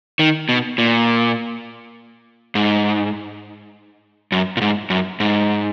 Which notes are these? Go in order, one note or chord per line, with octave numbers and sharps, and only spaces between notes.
D#3
B2
A#2
G#2
F#2
A#2
G#2
F#2
G#2